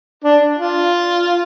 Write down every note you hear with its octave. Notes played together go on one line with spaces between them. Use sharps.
D4
F4